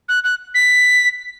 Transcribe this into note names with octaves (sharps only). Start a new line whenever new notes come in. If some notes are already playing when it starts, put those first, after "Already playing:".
F#6
F#6
B6